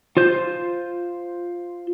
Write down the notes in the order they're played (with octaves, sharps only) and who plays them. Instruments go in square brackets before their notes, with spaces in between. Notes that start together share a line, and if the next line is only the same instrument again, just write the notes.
[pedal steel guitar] F4 C5 G6